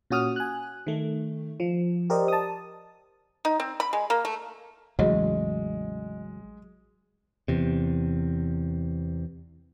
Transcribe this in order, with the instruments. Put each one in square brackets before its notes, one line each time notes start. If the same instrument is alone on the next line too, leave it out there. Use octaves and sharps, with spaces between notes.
[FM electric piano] A#2 C#4 F#4 D#6 F6
G#5 F#6
D#3 A3
F3
G4 A#4 C5 D5 D#5
A5 D#6
[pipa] D#4
C4
B5
G#3
A#3
A3
[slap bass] A1 E2 C#3 [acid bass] F#3 [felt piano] G#3 [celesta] D#5
[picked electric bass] E2 C3